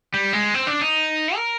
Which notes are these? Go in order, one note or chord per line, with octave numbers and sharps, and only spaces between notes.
G3
G#3
C4
D4
D#4
A#4